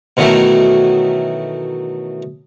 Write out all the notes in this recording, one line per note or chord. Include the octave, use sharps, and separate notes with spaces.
B2 D#3 E3 F#3 A3